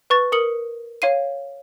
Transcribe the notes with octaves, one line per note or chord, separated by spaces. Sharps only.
B4 C#6 A6
A#4 D#6 C#7 F#7
C#5 F5 C7 D#7